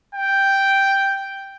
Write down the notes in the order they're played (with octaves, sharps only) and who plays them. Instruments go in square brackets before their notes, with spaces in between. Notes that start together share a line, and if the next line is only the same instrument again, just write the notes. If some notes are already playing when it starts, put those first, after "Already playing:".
[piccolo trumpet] G5